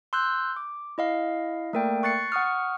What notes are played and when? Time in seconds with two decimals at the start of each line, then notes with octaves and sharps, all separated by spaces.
0.13 C6 E6 F#6 G6
0.56 D6
0.98 E4 D#5 F5
1.73 A3 A#3 A#4 D5 G5
2.03 C#6 F#6 A6 C7 C#7
2.32 F#5 C#6 D#6 F6